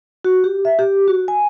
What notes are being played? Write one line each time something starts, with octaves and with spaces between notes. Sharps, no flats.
F#4
G4
E5
G4
F#4
G#5